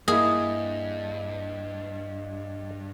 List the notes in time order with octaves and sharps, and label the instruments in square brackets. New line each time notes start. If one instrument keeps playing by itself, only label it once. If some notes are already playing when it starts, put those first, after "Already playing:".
[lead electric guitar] G2 [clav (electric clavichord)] A#3 E4 [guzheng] G#4 [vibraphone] D#5